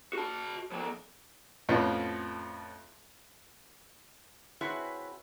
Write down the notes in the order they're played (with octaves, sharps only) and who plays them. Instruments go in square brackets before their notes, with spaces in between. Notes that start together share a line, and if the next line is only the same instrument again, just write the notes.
[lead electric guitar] F#4 A5
F3 B3
[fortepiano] F2 A2 F3 B3 C#4 F4
[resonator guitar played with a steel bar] C4 E4 F#4 G#4 B4 C#5